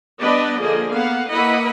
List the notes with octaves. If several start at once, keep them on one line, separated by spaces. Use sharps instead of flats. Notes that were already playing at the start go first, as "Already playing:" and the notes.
G3 B3 D4 B4 D5 D#5
D3 F3 A#3 G#4 D#5
A#3 B3 F5 F#5
A#3 E4 B4 D#5 F#5 B5